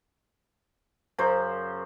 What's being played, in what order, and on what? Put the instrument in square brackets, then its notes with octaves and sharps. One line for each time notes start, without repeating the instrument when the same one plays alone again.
[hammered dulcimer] F#2 C#3 C5